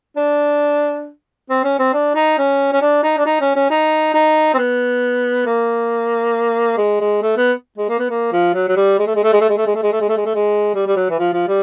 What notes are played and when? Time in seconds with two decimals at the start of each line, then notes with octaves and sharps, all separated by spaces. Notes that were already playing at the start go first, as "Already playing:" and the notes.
0.17 D4
1.50 C4
1.64 C#4
1.79 C4
1.93 D4
2.15 D#4
2.38 C#4
2.72 C#4
2.81 D4
3.03 D#4
3.18 D4
3.26 D#4
3.41 C#4
3.56 C#4
3.70 D#4
4.14 D#4
4.54 C4
4.58 B3
5.46 A#3
6.77 G#3
7.00 G#3
7.22 A3
7.37 B3
7.78 G#3
7.89 A#3
7.99 B3
8.10 A#3
8.32 F3
8.54 F#3
8.68 F#3
8.76 G3
8.99 G#3
9.07 A3
9.15 G#3
9.23 A3
9.33 G#3
9.41 A3
9.49 G#3
9.57 A3
9.66 G#3
9.75 A3
9.83 G#3
9.92 A3
10.00 G#3
10.09 A3
10.17 G#3
10.26 A3
10.35 G#3
10.74 G3
10.87 G3
10.96 F#3
11.10 E3
11.19 F3
11.33 F3
11.48 G3